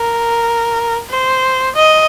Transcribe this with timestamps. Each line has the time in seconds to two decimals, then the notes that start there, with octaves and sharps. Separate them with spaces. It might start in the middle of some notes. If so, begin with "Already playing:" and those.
Already playing: A#4
1.09 C5
1.76 D#5